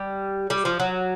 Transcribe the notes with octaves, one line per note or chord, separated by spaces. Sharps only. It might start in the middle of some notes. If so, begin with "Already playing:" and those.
Already playing: G3
G3
F3
F#3